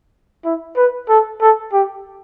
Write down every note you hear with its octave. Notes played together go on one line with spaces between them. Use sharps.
E4
B4
A4
A4
G4